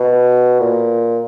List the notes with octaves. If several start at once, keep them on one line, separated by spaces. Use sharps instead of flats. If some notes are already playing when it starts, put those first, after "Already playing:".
Already playing: B2
A#2